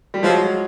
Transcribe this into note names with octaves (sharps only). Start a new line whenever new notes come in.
G3
F3 F#3 G#3